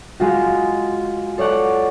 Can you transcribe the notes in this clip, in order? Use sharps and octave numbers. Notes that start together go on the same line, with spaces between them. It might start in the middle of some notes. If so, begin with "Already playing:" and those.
G#3 F4 F#4
A4 C#5 D5 F#5 A5